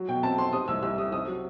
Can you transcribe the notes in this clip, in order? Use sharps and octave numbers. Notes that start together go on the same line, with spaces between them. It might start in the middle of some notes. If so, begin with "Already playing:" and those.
Already playing: F#3
B2 G5
C4 A5
C4 C6
C3 D#6
C2 E6
C2 E6
C3 D#6
C3 D#6
F#3